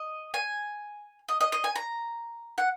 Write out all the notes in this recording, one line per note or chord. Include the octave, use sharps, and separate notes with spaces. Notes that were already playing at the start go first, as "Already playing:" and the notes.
Already playing: D#5
G#5
D#5
D#5
D#5
G#5
A#5
F#5